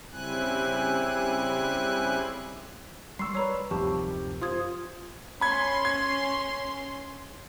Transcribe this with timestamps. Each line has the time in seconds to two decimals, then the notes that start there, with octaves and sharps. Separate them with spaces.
0.12 C#3 G3 C4 E4 G#5 F#6
3.19 G3 C6 C#6 E6 C7
3.35 B4 C#5 D5 A#5 B5
3.71 D1 F#2 C3 D#3 F3 G4 A5 C#6
4.42 F4 C5 C6 D#6 G#6
5.41 C#4 B5 C6 G#6
5.85 G#6